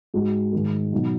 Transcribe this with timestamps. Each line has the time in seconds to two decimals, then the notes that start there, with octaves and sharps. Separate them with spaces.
0.14 G#2 G#3 D#4 F#4
0.53 G#2 D#3 G#3
0.93 B2 F#3 D#4 F#4